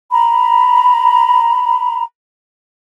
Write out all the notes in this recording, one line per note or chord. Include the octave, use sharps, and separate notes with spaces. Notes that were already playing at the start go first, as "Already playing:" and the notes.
A#5 B5